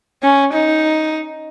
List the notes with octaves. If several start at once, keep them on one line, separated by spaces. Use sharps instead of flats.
C#4
D#4